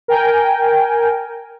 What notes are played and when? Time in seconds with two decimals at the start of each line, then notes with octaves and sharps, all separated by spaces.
0.08 A#4 G5 G#5